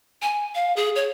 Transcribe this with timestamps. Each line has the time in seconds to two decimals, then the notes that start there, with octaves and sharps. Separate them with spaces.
0.22 G#5
0.55 F5
0.76 G#4
0.96 C#5